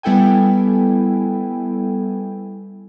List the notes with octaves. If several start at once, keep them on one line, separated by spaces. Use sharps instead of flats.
G3 B3 E4 A4 G5 G#5